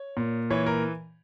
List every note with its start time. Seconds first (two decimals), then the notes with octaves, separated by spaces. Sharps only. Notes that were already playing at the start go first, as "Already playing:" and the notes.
Already playing: C#5
0.17 A#2
0.50 E3 C#5
0.66 A#4